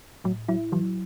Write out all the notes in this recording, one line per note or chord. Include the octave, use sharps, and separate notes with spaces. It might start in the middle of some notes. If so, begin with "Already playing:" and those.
A2 F#3
F#3 E4
E3 F#3